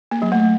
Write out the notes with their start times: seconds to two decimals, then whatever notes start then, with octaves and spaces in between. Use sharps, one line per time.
0.11 A#3
0.22 F#3
0.32 A3